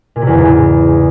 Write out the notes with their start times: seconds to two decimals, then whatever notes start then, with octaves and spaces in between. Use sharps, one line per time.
0.16 A#2
0.21 C3
0.27 E2
0.33 C#3
0.38 G#2